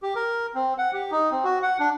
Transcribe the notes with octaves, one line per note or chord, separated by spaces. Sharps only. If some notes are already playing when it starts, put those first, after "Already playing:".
G4
A#4
C4
F#5
G4
D#4
C4
F#4
F#5
D4